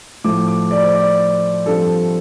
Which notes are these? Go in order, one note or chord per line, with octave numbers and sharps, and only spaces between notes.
A2 F3 A3 D6
D6
D5
C5
D5
G2 F3 C4 A4